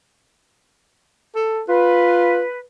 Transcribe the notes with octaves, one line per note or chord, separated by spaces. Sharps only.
A4
F4 B4